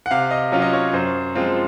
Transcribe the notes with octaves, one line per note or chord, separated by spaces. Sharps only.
F#5
C3 F5
D#5
F#3 C#4 F4
D#5
C#5
F#2 C5
F3 G#3 C4 F4